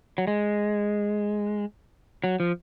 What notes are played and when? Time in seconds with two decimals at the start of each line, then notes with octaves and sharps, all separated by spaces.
0.18 F#3
0.27 G#3
2.24 F#3
2.40 F3